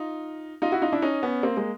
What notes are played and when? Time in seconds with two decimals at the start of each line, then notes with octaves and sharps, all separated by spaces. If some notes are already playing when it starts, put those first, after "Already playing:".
Already playing: D#4 F4
0.62 D#4 F4
0.72 E4 F#4
0.82 D#4 F4
0.92 D4 E4
1.02 C#4 D#4
1.23 B3 C#4
1.43 A#3 C4
1.57 G#3 A#3